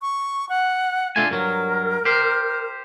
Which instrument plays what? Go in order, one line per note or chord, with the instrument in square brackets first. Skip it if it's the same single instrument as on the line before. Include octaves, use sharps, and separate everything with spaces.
[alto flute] C#6
F#5
[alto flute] A3 [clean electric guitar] D4 F4 G#5
[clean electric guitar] G2 F#3 [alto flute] A#4
[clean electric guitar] G4 C5